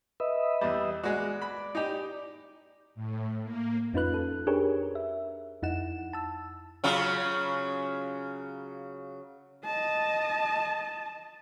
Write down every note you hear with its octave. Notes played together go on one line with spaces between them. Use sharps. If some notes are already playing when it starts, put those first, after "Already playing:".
B4 D#5 E5
E2 G3
G#3 F#4 D5
B5
D#4 G4
A2
A#3
F2 C#4 D#4 F4 B4 F#6
A4
D4 G4 G#4 A#4 B4 C#5
E5
F2 D#4 E4 F#5 E7
A5 E6
C#3 F#3 F4
D#5 A5